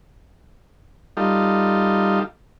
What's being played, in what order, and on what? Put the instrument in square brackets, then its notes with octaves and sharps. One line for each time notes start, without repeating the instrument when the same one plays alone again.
[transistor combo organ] G3 D#4 F4 A4